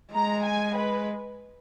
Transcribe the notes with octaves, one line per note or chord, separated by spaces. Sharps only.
G#3 A#5
G#5
B4